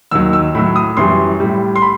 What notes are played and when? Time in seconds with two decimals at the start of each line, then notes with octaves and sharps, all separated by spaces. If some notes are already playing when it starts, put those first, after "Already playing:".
0.11 D#2 D#3 F#3 E6
0.33 E6
0.55 A2 F#3 B5
0.76 D#6
0.97 F#2 E3 G3 C6
1.40 A2 G3
1.76 C6
1.82 B5